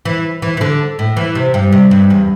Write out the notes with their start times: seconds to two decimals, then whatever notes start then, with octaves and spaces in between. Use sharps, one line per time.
0.05 E3
0.42 E3
0.57 E3
0.61 D3
0.99 A2
1.17 E3
1.35 C3
1.54 G2
1.72 C3
1.91 G2
2.10 E2